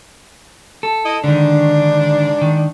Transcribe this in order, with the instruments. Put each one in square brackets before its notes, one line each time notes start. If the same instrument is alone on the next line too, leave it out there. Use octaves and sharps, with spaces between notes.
[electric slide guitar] A4
[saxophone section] E4 D#5
[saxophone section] G#2 D4 [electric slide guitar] D3 D#3
[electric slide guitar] D#3